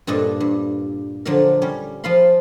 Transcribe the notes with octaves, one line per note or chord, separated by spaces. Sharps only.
G2 A#2 D4 A4 D#5
G2
D3 F3 F#3 D4 A#4
G3 C#4
F3 F4 F5 B5 C6